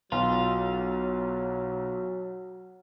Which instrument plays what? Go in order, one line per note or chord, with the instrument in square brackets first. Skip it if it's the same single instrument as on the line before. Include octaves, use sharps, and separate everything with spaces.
[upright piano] B1 [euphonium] F#3 [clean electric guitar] F4